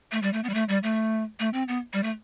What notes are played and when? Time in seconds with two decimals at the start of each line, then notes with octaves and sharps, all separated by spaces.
0.12 A3
0.22 G3
0.33 A3
0.44 B3
0.49 G3
0.54 A3
0.69 G3
0.83 A3
1.40 A3
1.53 C4
1.68 B3
1.93 G3
2.03 A3